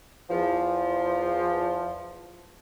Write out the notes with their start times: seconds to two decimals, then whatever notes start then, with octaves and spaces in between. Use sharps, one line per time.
0.30 E2 F3